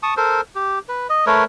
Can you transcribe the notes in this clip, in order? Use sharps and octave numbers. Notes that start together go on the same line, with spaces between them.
A5 C#6 D#6
A4 A#4 C5
G4
B4
D#5
A3 A#4 B4 C#5